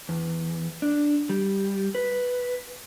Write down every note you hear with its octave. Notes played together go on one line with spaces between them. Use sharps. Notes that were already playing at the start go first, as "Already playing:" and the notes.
E2
D4
G3
B4